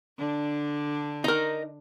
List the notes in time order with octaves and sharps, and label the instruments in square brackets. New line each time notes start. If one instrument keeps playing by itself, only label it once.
[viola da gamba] D3 D4
[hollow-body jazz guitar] D#4 A#4